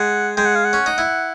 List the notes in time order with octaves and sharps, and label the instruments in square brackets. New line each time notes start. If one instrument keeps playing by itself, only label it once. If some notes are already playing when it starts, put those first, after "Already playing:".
Already playing: [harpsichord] G#3 [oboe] F#5
[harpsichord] G#3 [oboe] G5
[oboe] F#5
F5
F#5
[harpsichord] C#4
D#4
E4